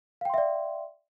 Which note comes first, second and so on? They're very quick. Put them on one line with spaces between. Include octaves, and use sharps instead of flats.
F5 G5 C6 E5 D5